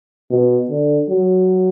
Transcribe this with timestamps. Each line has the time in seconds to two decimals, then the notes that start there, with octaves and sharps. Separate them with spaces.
0.31 B2
0.70 D3
1.10 F#3